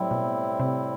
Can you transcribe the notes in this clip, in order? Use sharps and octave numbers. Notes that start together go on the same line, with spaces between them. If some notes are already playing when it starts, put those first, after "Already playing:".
Already playing: A2 F#3 G3 C4 E4
B2
C3